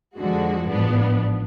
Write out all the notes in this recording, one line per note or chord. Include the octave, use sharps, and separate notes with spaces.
F2 D3 F3 G#3 F#4
A1 G#2 F3 B3 D4